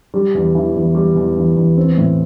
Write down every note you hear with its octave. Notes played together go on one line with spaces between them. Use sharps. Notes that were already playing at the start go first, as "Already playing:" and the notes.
G3
E2
E3
E2
G3
E2
E3
E2
C4
A2